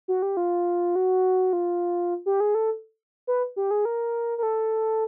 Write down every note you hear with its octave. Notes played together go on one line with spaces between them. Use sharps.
F#4
G4
F4
F#4
F4
G4
G#4
A4
B4
G4
G#4
A#4
A#4
A4